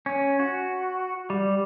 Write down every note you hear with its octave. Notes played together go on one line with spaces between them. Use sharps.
C#4
F#4
G3